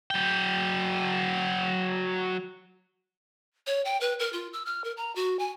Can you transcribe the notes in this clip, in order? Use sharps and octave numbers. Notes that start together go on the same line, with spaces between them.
F#3 G5
C#5
G5
B4
A#4
F4
E6
F6
A#4
A#5
F#4
G#5